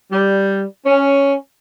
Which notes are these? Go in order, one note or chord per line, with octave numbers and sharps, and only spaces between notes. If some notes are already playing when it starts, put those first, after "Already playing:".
G3
C#4